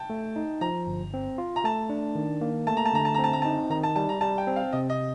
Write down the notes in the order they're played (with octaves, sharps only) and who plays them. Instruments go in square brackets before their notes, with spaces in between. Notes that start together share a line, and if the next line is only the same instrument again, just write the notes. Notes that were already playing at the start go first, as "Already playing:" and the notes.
Already playing: [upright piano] G5 A5
[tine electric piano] A3
D#4
[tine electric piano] F3 [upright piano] A#5
[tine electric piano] G1
C4
F4
[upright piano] A#5
[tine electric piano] A3 [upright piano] A5
[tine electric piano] D4
D#3
A#3
[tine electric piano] A3 [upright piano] A5
[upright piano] A#5
A5
[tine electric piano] D3 [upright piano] A#5
[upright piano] A5
[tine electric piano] C4 [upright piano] A#5
[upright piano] A5
A#5
[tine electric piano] D#4 [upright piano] A5
[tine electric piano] D#3 [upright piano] A#5
[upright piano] A5
[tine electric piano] G3 [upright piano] A5
[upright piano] A#5
[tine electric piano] G3 [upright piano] A5
[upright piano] G5
[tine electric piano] C4
[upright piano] F5
[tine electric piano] C3 [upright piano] D#5
[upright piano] D#5